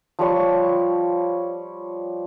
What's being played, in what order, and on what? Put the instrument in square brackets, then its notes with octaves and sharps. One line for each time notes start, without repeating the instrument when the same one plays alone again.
[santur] F3 G3 C#5 C#6